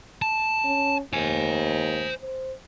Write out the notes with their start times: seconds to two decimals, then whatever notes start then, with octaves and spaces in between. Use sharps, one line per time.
0.22 A5
0.65 C#4
1.13 D#2 C5 G#5
2.21 C5